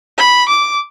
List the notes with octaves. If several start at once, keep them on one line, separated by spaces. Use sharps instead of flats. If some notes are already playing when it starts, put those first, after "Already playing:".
B5
D6